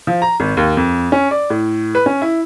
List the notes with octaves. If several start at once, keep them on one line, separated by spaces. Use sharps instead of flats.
F3
A#5
G#1
D#2
F2
C#4
D5
A2
B4
C#4
E4